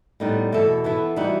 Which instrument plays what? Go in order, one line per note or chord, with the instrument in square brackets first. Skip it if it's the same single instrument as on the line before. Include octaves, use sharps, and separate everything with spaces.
[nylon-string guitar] A2 G3 B3 D#4
E2 B2 A3 E4 A4
E3 B3 E4 A4
E3 G3 D#4 F#4